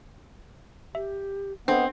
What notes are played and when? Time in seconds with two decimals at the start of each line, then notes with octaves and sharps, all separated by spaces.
0.95 G4 E5
1.68 B3 C4 D4 A4 D#5